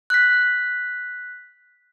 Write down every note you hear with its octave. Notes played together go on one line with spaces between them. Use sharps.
F#6 B6